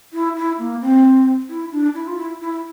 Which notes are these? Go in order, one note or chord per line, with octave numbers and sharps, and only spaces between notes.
E4
E4
A#3
C4
E4
D4
E4
F4
E4
E4